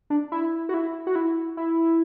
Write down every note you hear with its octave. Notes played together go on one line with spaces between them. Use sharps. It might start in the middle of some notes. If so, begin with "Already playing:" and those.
D4
E4
F#4
E4
F#4
E4
E4